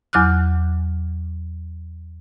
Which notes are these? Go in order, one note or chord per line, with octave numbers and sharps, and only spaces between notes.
E2 F#3 D6 F6 F#6